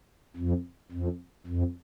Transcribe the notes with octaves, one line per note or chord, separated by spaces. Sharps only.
F2
F2
F2